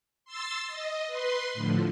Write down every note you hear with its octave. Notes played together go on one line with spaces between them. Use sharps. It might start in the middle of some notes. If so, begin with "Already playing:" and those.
C6 E6 A6
D#5
B4 C6
A2 D3 F3